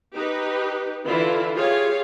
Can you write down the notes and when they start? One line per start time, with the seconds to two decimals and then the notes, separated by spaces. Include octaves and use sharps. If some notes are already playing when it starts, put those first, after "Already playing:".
0.15 D#4 G4 B4
1.05 D3 E3 E4 F4
1.54 F4 G4 G#4 C#5 F5